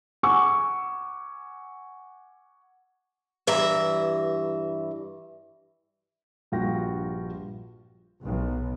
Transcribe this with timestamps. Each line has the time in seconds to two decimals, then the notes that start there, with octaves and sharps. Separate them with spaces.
0.23 F#5 G#5 C#6 D6 E6
3.47 G2 E3 E5 A#5
6.52 A#1 G2 F4 F#4 G5 A#6
8.24 B1